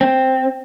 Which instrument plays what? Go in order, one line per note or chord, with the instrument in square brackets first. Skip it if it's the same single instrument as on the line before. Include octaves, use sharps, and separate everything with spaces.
[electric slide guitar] C4